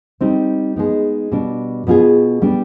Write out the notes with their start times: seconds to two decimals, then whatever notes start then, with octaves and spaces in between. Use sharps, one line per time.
0.21 G3 C4 D#4
0.76 G#3 B3 D#4
1.32 B2 G3 D4
1.87 B2 B3 F4 G#4
2.42 G3 B3 D4